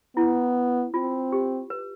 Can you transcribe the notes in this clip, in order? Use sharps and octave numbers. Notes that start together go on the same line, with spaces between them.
B3 E4
C4 F4
G4
B4